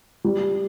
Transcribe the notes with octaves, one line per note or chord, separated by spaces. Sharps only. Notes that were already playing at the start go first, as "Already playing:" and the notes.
G3